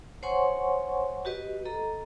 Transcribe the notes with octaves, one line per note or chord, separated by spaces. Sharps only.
C5 C#5 F#5 G#5 C6 C#6
F#4 G4 B4 D#5
A4 D#5 A#5